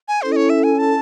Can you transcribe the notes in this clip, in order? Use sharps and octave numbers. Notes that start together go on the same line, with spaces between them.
G#5
C#4 E4 A4 C5
D#5
C#5
E5
G#5
A5